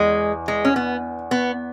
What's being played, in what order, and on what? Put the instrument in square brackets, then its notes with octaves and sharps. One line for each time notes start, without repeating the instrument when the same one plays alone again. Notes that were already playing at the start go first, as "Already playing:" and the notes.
Already playing: [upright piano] E2 [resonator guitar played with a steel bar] G#3
[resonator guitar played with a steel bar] G#3
C#4
B3
B3